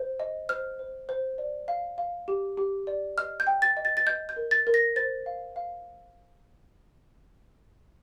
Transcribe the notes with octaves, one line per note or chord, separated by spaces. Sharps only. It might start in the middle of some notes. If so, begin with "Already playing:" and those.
Already playing: C5
D#5
C5 F6
C5
C5
D5
F5
F5
G4
G4
D5
D#5 F6
G6
G5
A6
D#5
A6
A6
D#5 G6
G6
A#4
A6
A#4
A#6
C5 A6
F5
F5